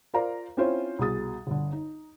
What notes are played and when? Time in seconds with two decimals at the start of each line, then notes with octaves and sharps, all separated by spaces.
0.14 F4 A#4 C5 D5 F5 A#5
0.57 C4 C#4 E4 F4 C5 C#5
0.99 C2 B2 G#4 D#6 A6
1.47 G1 D3
1.72 D#4